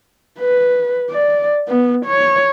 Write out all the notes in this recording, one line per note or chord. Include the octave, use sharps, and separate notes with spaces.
B4
D5
B3
C#5